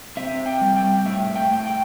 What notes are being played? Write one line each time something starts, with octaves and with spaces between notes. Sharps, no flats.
C3 E5
G5
G3
G5
A2 E5
G5
A2
G5